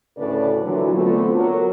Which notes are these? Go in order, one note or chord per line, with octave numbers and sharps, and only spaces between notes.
D2 A2 C#3 A4 B4 D5
A#2 D3 E3 F#3
D3 A3 B3 C4 F4 A4
F#3 A#4